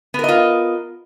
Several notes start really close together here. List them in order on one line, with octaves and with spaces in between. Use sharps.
B3 A#4 D#5 F4